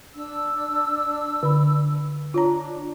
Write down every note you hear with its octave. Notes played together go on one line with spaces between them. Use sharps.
D4 E6
D3 B5
D4 F4 C#5 A#5